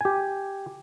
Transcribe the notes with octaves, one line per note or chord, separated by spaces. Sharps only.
G4 G#5